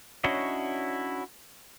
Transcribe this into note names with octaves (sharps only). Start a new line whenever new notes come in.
C#4 D4 E4 F#4 C#5 D#5